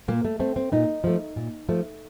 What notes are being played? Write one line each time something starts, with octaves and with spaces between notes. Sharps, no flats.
A#2 A#3
A3
A3 C4
C4
A#2 D#4
F3 A3
A#2
F3 A3